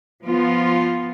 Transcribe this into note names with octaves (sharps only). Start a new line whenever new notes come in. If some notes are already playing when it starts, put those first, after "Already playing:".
F3 B3 F4